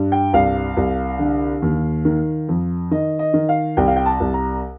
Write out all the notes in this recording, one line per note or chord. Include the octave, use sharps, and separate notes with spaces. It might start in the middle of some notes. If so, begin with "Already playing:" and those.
Already playing: G2
G5
C2 F5
C2
D3
D#2
D#3
F2
D#3 D#5
D#5
D#3
F5
C2 G5
F5
G5
A5
C2
A#5